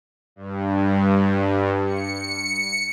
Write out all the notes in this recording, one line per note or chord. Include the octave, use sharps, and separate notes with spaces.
G2
C#7